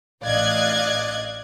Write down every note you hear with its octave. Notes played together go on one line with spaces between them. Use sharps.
A1 D5 D#5 F5 F#6 G#6